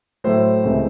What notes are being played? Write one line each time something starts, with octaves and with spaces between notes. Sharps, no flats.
A2 F#3 A3 C5
C#2 C3 E3 A3